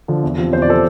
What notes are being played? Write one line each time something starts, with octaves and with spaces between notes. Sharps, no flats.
D3 F3
E2
C3 F3
E2 C5
D5
C3 F3 A4 C5